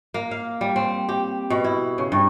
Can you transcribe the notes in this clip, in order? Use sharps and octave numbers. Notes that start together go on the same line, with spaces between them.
A#3
F5
G3
C4
G4
B2
E4
C#3
G2